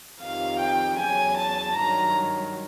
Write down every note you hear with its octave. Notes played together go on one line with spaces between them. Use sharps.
F2 C3 D#3 F5
G5
E2 C#3 F#3 G#5
A5
G2 D#3 F#3 A#5